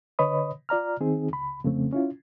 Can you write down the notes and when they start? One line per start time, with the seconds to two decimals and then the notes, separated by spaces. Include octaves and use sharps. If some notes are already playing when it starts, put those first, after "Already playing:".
0.19 D3 B4 C#5 D#5 B5 D#6
0.69 F4 D5 A#5 F6
1.00 D#3 C4 D#4 G#4
1.31 C#2 B5
1.64 F2 C#3 A3 C4
1.93 C#4 E4 F4